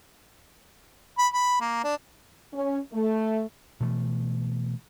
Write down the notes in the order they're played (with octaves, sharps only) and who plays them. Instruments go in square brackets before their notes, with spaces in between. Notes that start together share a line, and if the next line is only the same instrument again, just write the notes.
[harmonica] B5
B5
A#3
D4
[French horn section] C#4
A3
[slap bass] B2 E3 A3